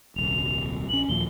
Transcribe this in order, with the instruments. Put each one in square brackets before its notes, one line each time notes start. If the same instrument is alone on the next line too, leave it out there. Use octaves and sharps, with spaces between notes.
[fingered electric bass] D#1 C2 [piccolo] F7
[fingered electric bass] A#1 C#4 [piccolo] F#7
[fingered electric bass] D#2 A#2 F3 [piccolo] G7